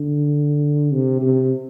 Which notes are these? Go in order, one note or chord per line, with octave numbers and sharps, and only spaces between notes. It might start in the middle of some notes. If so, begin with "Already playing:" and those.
Already playing: D3
C3
C3